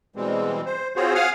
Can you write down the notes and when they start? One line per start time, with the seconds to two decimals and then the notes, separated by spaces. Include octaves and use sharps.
0.16 B2 E3 G3 G#3 C4
0.66 C5
0.96 C4 F4 F#4 G#4 C5 C#5
1.15 F5 F#5 G#5 D#6 F6